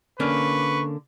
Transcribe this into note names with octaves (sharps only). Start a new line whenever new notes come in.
D3 A#3 C#4 B4 C#6